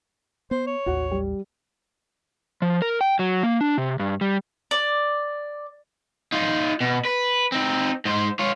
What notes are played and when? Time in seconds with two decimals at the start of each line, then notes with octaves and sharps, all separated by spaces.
0.51 B3 C5
0.67 C#5
0.86 A1 D#2 F#4 F#5
1.11 G3
2.62 F3
2.82 A#4
3.01 G5
3.19 F#3
3.43 A#3
3.61 D4
3.78 C3
3.99 G2
4.21 G3
4.71 D5
6.32 D#4 F4
6.81 B2
7.05 B4
7.52 C4 D#4
8.05 G#2 C5
8.39 F4 C#5